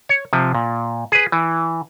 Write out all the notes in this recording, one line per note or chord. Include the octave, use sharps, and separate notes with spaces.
C#5
C3 F3
A#2
G#4 B4
E3